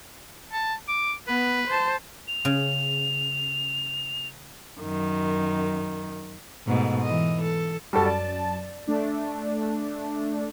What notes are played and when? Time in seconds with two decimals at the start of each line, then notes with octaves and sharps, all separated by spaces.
0.52 A5
0.88 D6
1.27 B3 B4
1.68 C5 A5
2.28 F7
2.45 C#3
4.80 F#2 D#3
6.67 G#2 B2 A3
7.03 E3 D#5
7.42 A4
7.93 F#2 G3 F#4 A4 A5
8.06 D5
8.87 A3 D4